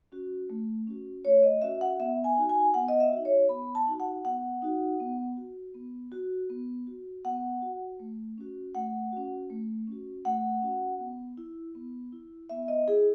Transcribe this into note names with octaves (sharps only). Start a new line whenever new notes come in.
C#4 F#4
A3
C#4 F#4
A3 C#5
D#5
C#4 F#4 E5
F#5
B3 E5
G#5
D#4 F#4
G#5
B3 F#5
D#5
E5
F#4
D#4
C#5
B3 B5
A5
D#4 F#4
F#5
B3 F#5
D#4 F#4
B3
F#4
B3
F#4
B3
F#4
B3 F#5
F#4
A3
C#4 F#4
A3 F#5
C#4 F#4
A3
C#4 F#4
A3 F#5
C#4 F#4
B3
E4
B3
E4
B3 E5
D#5
E4 G#4